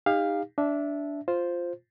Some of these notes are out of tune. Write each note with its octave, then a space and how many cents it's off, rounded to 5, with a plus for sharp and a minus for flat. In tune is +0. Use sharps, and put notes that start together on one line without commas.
D#4 +0 G4 +40 F5 +0
D4 -15 E5 +0
F4 +0 C5 +0